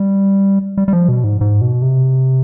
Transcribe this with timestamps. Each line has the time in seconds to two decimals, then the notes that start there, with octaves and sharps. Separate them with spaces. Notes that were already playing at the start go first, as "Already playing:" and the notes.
Already playing: G3
0.78 G3
0.88 G3
0.93 F3
1.09 B2
1.24 G#2
1.41 G#2
1.61 B2
1.82 C3